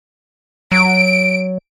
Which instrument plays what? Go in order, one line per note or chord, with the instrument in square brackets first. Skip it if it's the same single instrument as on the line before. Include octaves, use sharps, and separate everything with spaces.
[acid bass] F#3 [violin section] D7